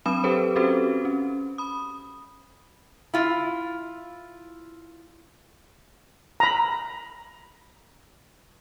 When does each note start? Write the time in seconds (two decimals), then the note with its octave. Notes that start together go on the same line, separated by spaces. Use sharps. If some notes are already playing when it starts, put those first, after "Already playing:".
0.06 F#3 C4 D4 B5 D#6 E7
0.24 D4 G4 A4 B4 C5
0.56 C4 C#4 F#4 G4 A4 C5
1.05 C#4
1.58 B5 D#6
3.14 E4 F4
6.40 A#5 B5